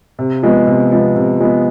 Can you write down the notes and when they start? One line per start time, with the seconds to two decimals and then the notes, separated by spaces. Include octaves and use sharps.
0.19 C3
0.43 F3 G#3 B3
0.67 C3
0.91 F3 G#3 B3
1.15 C3
1.40 F3 G#3 B3